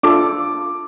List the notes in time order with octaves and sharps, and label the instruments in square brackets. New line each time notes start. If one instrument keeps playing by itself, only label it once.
[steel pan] D4 F4 A4 [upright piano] D6